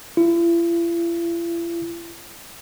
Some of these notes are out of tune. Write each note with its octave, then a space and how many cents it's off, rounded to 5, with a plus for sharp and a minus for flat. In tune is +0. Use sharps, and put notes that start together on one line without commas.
E4 +45